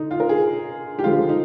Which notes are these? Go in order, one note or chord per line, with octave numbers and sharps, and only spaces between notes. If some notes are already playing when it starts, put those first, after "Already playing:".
Already playing: D3 D#4
F4
A#4
G#4
G4
D3 F3 G#3 F4
D#4